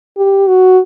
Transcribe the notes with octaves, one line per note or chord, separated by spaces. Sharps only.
G4
F#4